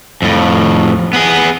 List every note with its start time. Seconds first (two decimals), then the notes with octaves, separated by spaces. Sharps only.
0.22 F2 A2
1.13 B3 G#4